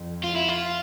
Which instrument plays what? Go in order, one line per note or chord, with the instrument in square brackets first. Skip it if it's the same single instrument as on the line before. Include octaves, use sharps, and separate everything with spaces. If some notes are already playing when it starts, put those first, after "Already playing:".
Already playing: [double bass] F2
[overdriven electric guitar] F4
E4
F4